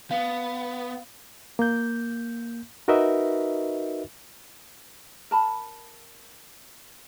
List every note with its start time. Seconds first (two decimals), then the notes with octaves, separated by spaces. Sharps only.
0.11 B3 F5
1.59 A#3 G6
2.88 D#4 F#4 A#4 B4 D#5 E5
5.31 A#4 A5 B5